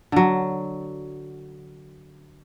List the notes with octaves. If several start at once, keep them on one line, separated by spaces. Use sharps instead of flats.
D3 F#3